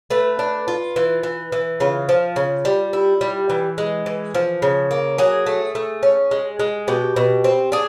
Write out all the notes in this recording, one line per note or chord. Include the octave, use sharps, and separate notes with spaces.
A3 B4
D4
F4
E3
E3
E3
C#3 F4
F3
C#3
G3
E4
G3
E3
G#3
E3
F3
C#3
A#3
F#3 G#4
A3
A3
C#4
G#3
G#3
B2 G4
B2
C4
D4 G#4